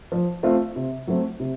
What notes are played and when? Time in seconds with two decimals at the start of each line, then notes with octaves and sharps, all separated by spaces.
0.12 F3
0.43 A3 C4 F4
0.76 C3
1.07 F#3 A3 C4
1.40 C3